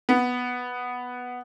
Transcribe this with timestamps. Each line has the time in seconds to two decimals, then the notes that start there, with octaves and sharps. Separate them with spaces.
0.09 B3